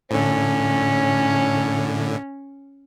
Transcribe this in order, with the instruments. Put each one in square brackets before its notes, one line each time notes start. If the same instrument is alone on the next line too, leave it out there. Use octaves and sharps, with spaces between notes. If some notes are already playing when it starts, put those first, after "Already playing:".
[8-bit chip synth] A2 D3 [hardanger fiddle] C#4